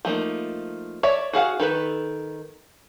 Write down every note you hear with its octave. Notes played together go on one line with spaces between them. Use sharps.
F3 A3 A#3 D#4
C#5 D5 E5
F#4 G#4 F5 F#5
D#3 A4 B4